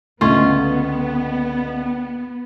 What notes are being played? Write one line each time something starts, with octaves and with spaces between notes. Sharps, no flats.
C#2 D3 A3 B3 C#4 F4 D#5